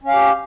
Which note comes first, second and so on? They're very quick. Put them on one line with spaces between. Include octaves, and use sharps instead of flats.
C#4 F5 G4